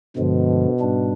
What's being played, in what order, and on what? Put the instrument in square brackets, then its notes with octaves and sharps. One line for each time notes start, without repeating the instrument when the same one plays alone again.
[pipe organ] G2 D3 F3 G#3 [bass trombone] B2
[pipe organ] G#2 G3 D4